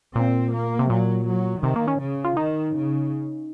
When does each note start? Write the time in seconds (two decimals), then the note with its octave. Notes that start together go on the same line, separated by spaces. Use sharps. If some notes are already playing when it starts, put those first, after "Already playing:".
0.15 A#2 C4
0.53 A#3
0.79 C3
0.90 A#2 F#3
1.27 F#3
1.63 C3 D#3
1.76 A#3
1.87 C#4
1.99 C#3
2.24 F4
2.36 D#3 D#4
2.74 C#3